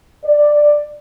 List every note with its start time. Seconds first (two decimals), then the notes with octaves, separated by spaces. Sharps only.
0.25 D5